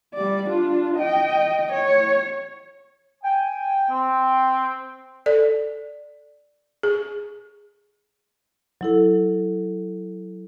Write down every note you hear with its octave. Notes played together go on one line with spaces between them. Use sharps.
G3 D5
D4 F4
D#5 G5
C#5
G5 G#5
C4
A4 D5
G#4
F#3 E4 A4